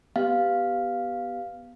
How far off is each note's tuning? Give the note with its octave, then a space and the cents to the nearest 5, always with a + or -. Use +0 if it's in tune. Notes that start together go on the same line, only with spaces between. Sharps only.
B3 +0 G4 +0 F5 +0